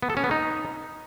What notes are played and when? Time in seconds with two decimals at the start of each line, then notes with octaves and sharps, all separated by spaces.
0.03 B3
0.10 A4
0.17 C#4
0.24 B3
0.31 D#4